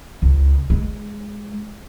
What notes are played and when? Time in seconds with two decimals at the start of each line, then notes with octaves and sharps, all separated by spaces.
0.22 C#2
0.70 G#3